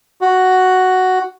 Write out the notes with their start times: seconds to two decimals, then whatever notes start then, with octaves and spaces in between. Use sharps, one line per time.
0.21 F#4